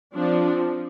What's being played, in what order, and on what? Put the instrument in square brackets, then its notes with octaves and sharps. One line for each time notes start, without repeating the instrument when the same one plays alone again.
[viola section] F3 C4 D4